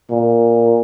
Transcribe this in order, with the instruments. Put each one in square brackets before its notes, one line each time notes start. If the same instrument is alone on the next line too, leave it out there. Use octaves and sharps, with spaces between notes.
[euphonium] A#2